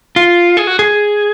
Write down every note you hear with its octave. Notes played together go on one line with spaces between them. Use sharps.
F4
G#4
F#4
G#4